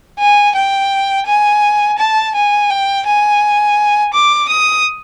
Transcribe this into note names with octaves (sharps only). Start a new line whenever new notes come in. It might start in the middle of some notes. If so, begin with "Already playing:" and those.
G#5
G5
G#5
A5
G#5
G5
G#5
D6
D#6